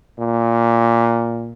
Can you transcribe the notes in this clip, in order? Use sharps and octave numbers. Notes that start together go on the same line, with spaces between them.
A#2